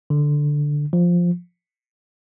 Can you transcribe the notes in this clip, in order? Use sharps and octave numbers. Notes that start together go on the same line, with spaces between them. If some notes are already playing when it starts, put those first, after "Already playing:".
D3
F3